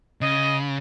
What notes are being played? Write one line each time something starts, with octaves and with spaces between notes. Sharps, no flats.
C#3 D#5